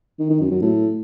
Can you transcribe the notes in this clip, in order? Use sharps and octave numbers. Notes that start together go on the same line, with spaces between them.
D#3
D#3
F#2
F#3
A2